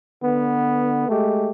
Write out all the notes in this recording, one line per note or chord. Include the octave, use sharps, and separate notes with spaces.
D3 B3
G#3 A3 G4